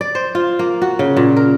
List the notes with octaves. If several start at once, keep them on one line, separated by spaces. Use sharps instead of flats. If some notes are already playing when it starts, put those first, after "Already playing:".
D5
C5
F4
A#3
F#4
C#3
A#2
A#4